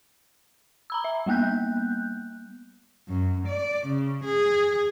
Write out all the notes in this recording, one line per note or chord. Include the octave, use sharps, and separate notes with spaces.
A#5 B5 E6
E5
G3 A#3 B3 F#6 G6
F#2
D5
C#3
G#4